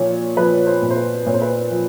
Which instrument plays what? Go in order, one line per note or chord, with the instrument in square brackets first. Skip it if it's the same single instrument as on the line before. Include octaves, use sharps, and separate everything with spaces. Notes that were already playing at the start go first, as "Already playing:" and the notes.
Already playing: [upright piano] A#2 F3 C#5
F3 B4
C5
A#2
C5
B4
A#2 C#5
C5
B4
C5
F3